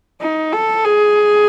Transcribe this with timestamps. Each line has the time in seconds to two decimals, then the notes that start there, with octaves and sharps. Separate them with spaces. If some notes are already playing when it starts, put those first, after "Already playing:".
0.20 D#4
0.52 A4
0.84 G#4